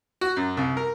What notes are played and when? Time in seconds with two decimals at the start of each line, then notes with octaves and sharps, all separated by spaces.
0.21 F#4
0.36 F#2
0.57 C2
0.77 A#4